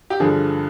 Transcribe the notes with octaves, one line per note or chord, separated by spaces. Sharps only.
G4
G2 D3 F3 G#4